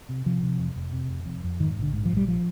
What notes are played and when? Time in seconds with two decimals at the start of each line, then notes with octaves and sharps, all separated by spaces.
0.09 C3
0.26 C3 F3
0.43 C3
0.59 F1
0.76 F1
0.93 C3
1.09 F1
1.26 F2
1.44 F2
1.60 G#2 D#3
1.78 A#1 D3
1.93 G#2
2.05 F3
2.11 A#1
2.17 G3
2.28 F3